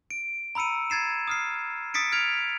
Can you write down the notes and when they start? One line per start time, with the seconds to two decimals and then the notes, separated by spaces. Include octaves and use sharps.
0.10 D7
0.55 A#5 B5 E6 C#7 D#7
0.90 G#6 A6 C7 E7
1.28 D#6 F6 C7
1.94 D#6 A6 B6 C#7 D7
2.12 D#6 F6 G#6 D7 F7